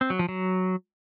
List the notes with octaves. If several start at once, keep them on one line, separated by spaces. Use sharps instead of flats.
C4
F#3
F3
F#3